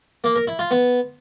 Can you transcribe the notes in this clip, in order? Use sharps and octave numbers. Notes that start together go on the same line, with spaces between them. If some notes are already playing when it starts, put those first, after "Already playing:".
A#3
A#4
E4
F4
B3